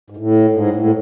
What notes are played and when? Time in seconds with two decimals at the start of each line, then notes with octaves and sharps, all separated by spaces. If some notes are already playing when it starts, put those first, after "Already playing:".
0.10 G#2
0.17 A2
0.50 G#2
0.71 A2